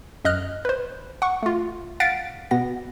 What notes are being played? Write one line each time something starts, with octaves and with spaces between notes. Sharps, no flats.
F#2 D#5 F6 F#6
B4 C5
F#5 C#6
A3 F4
F5 F#5 A6 B6 D7
B2 B3 A#6